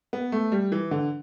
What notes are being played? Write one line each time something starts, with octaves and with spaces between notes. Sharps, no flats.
B3
A3
G3
E3
D3